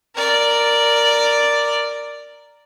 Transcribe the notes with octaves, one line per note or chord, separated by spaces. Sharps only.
A#4 D5